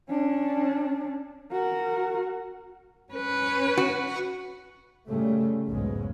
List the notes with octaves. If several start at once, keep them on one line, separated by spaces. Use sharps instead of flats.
C#4 D4
F#4 A#4
C#4 B4
F#4
A#2 C#3 G3 A3
B1 E2 G#2 C#3 G#3